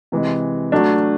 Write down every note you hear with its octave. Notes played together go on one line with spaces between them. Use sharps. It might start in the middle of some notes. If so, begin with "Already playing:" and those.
C3 E3 G#3
F#3 A3 D4